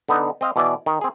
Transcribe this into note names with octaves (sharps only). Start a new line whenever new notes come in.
D3 B3 D#4
C4 D#5 F5
B2 E3 D5
D#3
C4 G#4